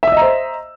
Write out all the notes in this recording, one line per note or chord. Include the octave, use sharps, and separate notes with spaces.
C5 D#5 E5 A#5 E6